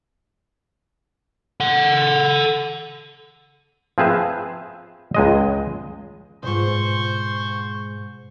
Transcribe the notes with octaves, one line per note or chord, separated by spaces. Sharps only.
A4 F#5
F3 C4 G#4 B4 E5
C#2 G#3 D#5
E2 G#2 B2 F4 C5 C#6